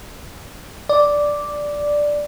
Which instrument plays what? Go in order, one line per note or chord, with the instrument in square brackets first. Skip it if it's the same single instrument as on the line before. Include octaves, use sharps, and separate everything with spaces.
[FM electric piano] D5